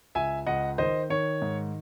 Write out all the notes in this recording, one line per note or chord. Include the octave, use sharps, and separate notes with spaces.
C#2 E5 G#5
C#2 D#5 F#5
D#3 C5 D#5
D#3 C#5
G#2